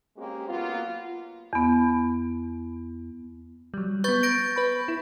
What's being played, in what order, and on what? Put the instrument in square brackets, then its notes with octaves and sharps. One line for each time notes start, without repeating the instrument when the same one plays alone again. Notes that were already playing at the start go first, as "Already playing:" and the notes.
[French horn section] G#3 A#3 C4 C#4 G4 G#4
F#3 A#3 B3 F4
[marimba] E2 B3
[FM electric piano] F#3 G3
[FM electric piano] B3 B4 [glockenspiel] C#6 G6 A6
[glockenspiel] G6 A#6 D7
[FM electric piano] B4 B5
E4